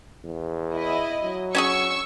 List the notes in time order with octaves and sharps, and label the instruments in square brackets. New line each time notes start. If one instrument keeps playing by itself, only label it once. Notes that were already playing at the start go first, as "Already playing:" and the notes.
[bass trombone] E2
[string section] E4 D#5
[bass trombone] F#3
[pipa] C#4 F#4 G#4 [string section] C#6 E6